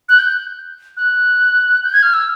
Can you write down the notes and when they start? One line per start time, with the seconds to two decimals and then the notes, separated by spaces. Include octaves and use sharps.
0.09 F#6
0.19 G6
0.97 F#6
1.84 G6
1.93 G#6
2.02 F6
2.13 E6